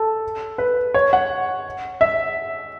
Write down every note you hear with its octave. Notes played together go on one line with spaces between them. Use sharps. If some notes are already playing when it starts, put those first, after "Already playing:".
Already playing: A4
B4
C#5
F#5
E5